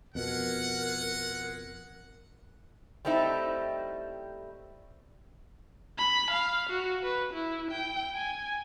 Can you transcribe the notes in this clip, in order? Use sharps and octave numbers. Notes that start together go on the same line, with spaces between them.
F2 B2 G#3 A#4 F#5
G3 A3 C4 D#4 E4
B5
F5
F#4
B4
E4
G5
G#5